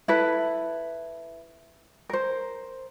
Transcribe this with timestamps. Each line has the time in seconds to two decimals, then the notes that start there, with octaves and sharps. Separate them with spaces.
0.08 E4 A4 B4
2.09 A#4 C5